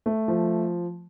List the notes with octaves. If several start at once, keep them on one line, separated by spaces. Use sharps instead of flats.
A3
F3